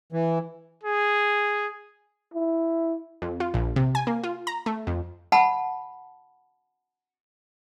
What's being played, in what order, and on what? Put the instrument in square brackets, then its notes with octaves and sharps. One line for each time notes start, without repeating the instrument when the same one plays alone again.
[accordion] E3
[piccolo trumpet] G#4
[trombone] E4
[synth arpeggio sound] F2
F4
A#1
C3
G#5
A#3
F4
A#5
A3
F2
[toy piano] F#5 A5 B5